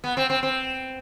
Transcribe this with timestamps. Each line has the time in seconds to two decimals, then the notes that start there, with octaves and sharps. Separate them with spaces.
0.04 B3
0.17 C4
0.30 C4
0.43 C4